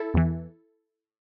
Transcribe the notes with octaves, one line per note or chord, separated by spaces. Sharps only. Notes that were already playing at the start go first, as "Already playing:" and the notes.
Already playing: E4 A4
E2 E3